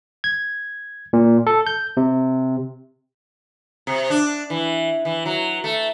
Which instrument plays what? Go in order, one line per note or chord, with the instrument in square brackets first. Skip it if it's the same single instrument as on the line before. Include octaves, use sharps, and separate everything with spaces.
[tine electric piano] G#6
A#2
A4
G6
C3
[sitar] C3
D4
E3
E3
F#3
A3